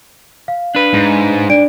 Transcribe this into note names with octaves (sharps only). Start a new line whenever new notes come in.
F5
D4 B4
G#2
D4 D5 D7